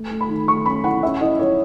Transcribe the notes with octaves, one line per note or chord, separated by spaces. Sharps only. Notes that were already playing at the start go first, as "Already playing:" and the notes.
Already playing: A3
A3
B5
D#3
A3 C#6
C#4 B5
E4 F#5
C#4 E5
E4 D#5
E4 C#5